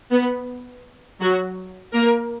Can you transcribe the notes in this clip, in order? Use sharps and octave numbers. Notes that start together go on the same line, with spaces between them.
B3
F#3 F#4
A#3 A#4